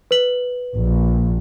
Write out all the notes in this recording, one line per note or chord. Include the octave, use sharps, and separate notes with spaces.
B4 F#7
A#1